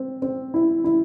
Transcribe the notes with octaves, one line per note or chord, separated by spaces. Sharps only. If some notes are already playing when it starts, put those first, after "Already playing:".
Already playing: C4
C4
E4
E4